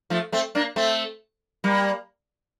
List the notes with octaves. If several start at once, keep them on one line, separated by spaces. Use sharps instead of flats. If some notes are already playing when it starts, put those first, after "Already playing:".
F3 A3
A3 C4
A#3 D4
A3 C4
G3 A#3